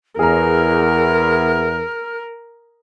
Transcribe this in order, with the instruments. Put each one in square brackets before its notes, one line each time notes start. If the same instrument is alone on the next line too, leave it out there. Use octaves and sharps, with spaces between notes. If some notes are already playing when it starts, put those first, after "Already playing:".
[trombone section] E2 [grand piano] G#4 A#5 [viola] A#4 [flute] F6